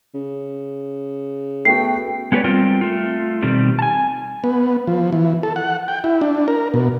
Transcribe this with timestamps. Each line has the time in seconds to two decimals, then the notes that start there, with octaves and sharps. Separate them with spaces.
0.15 C#3
1.65 A3 B3 F#4 G5 C7
2.32 G#3 B3 G4 B4 C#5 D5
2.44 G3 C4 F4 A#4 G5
2.81 A3 F4
3.42 B2 D#3 G3 C4
3.79 G#5 A5
4.44 B3
4.87 F3
5.12 E3
5.43 A4
5.56 F#5
5.88 G5
6.04 E4
6.21 D4
6.48 A#4
6.74 B2